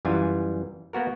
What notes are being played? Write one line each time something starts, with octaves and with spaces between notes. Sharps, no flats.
F#2 E3 G3 F4 G#5
A#3 B3 F#4 A#4